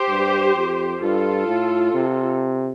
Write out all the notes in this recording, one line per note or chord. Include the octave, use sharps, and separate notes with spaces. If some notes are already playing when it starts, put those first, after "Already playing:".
Already playing: G4 C5
G2
F2
G2 F4 A4
A2
C3